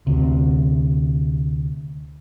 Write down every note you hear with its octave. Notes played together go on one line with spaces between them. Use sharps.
D2 C3